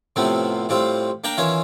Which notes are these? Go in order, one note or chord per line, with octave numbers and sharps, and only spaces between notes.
A2 C3 F3 B3 C4
A2 G3 C4 F4
A#3 D4 G5 A#5
D#3 E3 C#4 F4 C#5